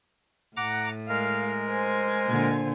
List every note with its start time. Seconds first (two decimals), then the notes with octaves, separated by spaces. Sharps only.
0.57 A2 F#5 A#5 D6
1.09 G#3 A#4 F5
1.69 C5 G#5
2.26 A#2 D3